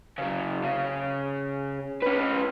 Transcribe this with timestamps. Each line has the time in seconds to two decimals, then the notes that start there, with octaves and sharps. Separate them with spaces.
0.18 C#3 F#3
0.64 C#3
2.03 C#4 B4